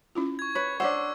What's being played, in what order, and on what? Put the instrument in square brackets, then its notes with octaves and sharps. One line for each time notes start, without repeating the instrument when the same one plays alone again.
[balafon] C#4 E4 F4
[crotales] C#6 G#6
[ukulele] B4 C#5
[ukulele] D4 D#4 C5 [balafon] C#5 F#5 [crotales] C#6 E6